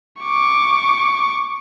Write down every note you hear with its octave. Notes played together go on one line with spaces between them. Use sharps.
C#6 D6